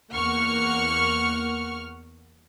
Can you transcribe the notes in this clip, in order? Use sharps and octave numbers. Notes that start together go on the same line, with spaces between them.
E2 A#3 F#5 C#6 F6